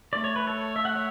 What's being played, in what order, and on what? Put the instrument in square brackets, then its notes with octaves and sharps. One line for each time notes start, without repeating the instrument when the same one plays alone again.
[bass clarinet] A3 [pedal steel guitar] D5
[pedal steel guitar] C#5
B4
A4 C#5
E5
F#5
C#5 E5